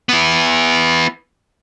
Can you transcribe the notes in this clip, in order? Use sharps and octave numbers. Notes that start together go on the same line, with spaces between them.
B3 E4